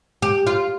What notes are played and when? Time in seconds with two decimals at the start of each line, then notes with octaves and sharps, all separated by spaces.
0.22 G4
0.47 F4